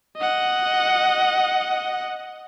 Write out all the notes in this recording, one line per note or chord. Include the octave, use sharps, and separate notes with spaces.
D#5 F#5